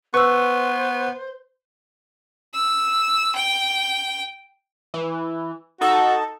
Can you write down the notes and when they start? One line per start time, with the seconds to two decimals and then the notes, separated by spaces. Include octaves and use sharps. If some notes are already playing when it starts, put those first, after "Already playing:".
0.14 B3 B4 C5 C#6 E6
2.54 E6
3.36 G5
4.94 E3
5.81 D#4 F#4 A4